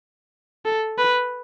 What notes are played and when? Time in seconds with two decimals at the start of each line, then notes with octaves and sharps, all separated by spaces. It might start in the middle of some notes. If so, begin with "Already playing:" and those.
0.65 A4
0.99 B4